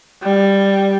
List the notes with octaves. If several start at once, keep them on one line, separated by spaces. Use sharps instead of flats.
G3